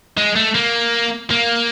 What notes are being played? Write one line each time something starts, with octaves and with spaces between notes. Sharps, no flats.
G#3
A3
A#3
A#3